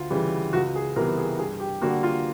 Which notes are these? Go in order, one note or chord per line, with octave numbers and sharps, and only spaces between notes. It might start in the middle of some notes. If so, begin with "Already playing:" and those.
Already playing: D2 F4
C#3 E3 G3
C#2 F#4
G#4
C3 E3 G3 B3 A#4
G#4
G2 G#4
G4
D3 G3 A#3 F#4
F4